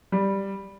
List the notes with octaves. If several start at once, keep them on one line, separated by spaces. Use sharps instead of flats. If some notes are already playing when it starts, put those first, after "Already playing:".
G3